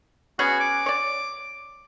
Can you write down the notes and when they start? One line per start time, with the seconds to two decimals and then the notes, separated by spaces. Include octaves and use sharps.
0.39 B3 C#4 F#4 G#4
0.60 D6
0.86 C#5 D5